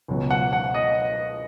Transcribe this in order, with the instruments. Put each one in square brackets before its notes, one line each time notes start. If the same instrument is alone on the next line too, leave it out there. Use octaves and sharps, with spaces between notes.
[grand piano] C#2 B2 F#3
F#5
F#5
D#5